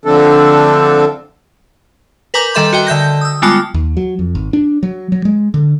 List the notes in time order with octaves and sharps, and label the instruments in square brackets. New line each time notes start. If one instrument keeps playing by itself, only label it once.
[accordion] D3 F3 A3 C4 D4 A4
[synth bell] A#4 B4 G#5 A#5 D6 G6
D#3 G3 A4 E5 C6 G6
F#4 D#5 G5
D3 E5 G6 A#6
D#6 E6
G3 G#3 B3 F4 A5 C#7
[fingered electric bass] D#2
F#3
F2
G#1
D4
F#3
F#3
G#3
D3